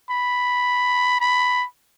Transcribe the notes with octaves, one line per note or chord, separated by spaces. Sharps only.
B5
B5